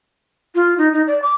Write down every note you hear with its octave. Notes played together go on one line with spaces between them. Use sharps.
F4
D#4
D#4
D5
D6